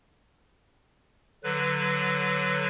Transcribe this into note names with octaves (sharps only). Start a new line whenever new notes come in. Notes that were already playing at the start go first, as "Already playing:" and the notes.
D3 F#3 B4